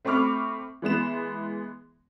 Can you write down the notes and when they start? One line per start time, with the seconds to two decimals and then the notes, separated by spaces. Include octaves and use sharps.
0.05 A3 C4 B5 C#6 D6 F6
0.82 E3 G#3 B3 E7